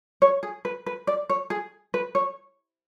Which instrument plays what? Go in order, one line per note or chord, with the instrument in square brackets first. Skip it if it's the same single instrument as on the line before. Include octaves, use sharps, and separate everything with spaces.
[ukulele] C#5
G#4
B4
B4
D5
C#5
G#4
B4
C#5